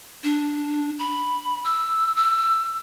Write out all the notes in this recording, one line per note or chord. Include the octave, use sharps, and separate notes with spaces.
D4
B5
E6
E6